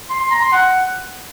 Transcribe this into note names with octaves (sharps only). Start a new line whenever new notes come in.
C6
C6
A#5
C6
F#5